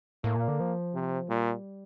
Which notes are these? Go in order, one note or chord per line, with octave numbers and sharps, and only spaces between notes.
A2 A#3
A#2
D3
F3
C3
A#2 G3